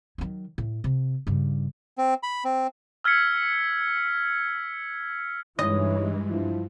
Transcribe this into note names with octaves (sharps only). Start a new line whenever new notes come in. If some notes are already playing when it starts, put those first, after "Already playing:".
D#3 F#3
A2
C3
G2 C#3
C4
B5
C4
E6 F6 G#6 B6 C#7
G2 E3 G#3 D#4 E4 C#5 D#5
F3 E4